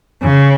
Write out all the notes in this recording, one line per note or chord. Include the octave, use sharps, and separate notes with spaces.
C#3